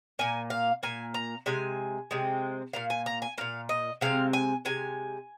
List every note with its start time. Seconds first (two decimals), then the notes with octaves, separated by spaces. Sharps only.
0.19 A#2 A#3 G#5
0.50 F5
0.83 A#2 A#3 G#5
1.14 A#5
1.46 C3 G#3 G#5
2.11 C3 G#3 C4
2.73 A#2 A#3 F5
2.90 G#5
3.06 A#5
3.22 G#5
3.38 A#2 A#3 F5
3.69 D#5
4.01 C3 G#3 C4 F5
4.33 G#5
4.65 C3 G#3 G#5